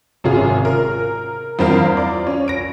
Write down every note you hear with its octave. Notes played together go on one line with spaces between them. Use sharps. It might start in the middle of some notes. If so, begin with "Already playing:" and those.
G#1 C3 C#4 F4 G#4
A#4
E2 G2 C4 F4 A#4 F5
D5
C#4
A#6 D7